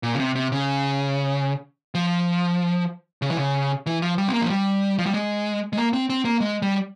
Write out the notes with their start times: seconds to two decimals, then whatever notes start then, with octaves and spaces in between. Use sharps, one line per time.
0.03 A#2
0.15 C#3
0.20 C3
0.36 C3
0.52 C#3
1.95 F3
3.22 C#3
3.30 E3
3.37 C#3
3.86 E3
4.02 F3
4.18 G3
4.28 C4
4.34 A#3
4.41 F3
4.50 G3
4.98 F3
5.06 G3
5.14 G#3
5.73 G#3
5.77 A#3
5.93 C4
6.10 C4
6.25 A#3
6.40 G#3
6.62 G3